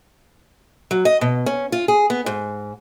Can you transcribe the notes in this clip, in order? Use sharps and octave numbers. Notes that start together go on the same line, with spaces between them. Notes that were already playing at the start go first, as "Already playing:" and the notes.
F#3
D#5
B2
C#4
F4
G#4
B3
G#2